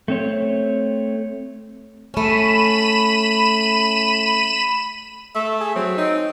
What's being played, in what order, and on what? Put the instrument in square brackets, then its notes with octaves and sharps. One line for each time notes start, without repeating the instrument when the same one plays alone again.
[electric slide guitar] A3 C4 C#5
[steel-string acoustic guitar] A3 C#4 [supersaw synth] B5 D#7 E7
[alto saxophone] A3 [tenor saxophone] E5
[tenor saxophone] G#4
[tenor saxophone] F#3 [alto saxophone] C4
[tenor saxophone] D#4